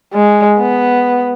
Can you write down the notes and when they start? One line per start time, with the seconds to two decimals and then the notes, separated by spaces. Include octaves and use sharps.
0.13 G#3
0.59 B3